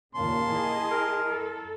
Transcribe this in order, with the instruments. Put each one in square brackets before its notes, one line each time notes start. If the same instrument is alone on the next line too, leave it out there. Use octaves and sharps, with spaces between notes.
[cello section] D#2 A#2 C#3 [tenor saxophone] A#3 [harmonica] A5 C6
[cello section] E4 G#4 D#5
[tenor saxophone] A#4
[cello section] A4